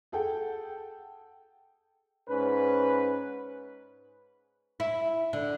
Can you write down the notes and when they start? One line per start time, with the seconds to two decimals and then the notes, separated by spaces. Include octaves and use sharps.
0.12 G#4 A4 F#5 G5
2.28 G#2 C#4 B4
4.80 E4
5.33 D3